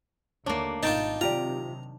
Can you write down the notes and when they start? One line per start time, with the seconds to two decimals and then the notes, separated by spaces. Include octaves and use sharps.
0.46 D#2 D3 A3 A#3 D4 C#5
0.83 G#1 B2 D#4 F4 G5 A5
1.21 C3 D#3 F#3 F4 G4 D5 A#5